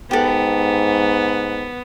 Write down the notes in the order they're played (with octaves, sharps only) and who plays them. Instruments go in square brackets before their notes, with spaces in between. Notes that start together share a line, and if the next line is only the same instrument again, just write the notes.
[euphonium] G#2 [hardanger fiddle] B3 [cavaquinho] G4 A4